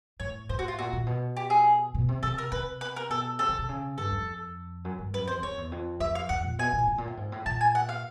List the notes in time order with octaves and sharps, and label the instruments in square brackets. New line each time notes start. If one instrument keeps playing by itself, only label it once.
[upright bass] A2 [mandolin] C#5
[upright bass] A2 [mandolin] C5
[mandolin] F#4
F4
[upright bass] A#2 [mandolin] F#4
[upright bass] A#2
B2
[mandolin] G4
G#4
[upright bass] B2
C3
[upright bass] C3 [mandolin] A4
[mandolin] A#4
[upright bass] C3 [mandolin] B4
[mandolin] B4
A#4
[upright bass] B2 [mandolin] A4
[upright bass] C3 [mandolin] A4
[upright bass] C#3
C3
C#3
[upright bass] G2 [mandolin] A4
[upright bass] F2
F#2
G2
[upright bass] F#2 [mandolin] B4
[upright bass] F2 [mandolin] C5
[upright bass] F2 [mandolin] C#5
[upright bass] E2
F2
[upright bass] F2 [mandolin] E5
[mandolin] F5
[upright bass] F2 [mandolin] F#5
[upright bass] A#2
[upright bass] B2 [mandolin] G#5
[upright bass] A#2
A2
A#2
A2
G#2
A2
[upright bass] A#2 [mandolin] A5
[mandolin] G#5
F#5
F5